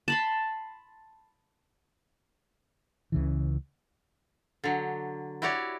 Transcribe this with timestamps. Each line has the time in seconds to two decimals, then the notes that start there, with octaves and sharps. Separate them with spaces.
0.08 A5 B5 C6
3.12 C#2 C#3 E3
4.64 D3 F#3
5.42 E4 F#4 G4 C#5 D5